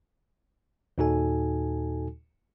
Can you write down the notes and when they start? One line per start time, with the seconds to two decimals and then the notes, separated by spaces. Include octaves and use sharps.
0.98 D#2 A#2 D#4 F#4 A4 G#5